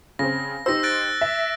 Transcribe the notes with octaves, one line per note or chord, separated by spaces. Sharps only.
C#3 C4 A#6
D#4 G4 C5 E6 A#6
F#6 A6 D7
E5